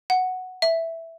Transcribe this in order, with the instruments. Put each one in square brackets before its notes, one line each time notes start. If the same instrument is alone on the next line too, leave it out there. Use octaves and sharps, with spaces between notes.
[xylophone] F#5
E5